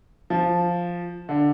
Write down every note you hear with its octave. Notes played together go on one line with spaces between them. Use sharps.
F3
D3